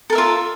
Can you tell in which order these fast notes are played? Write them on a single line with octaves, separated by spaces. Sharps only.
A4 A#4 E5 F4